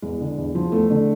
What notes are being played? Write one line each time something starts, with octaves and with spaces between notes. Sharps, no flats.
E2 G#3
D3
E2
F3
E2 A3
D3